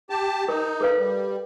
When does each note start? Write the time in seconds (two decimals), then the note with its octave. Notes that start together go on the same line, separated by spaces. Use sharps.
0.10 G4 A5
0.48 D#4 A#4
0.81 A4 B4 F5
0.99 G3